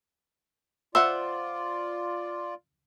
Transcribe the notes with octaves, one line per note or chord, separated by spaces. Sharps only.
F4 C5 D5 E5 F#5 E6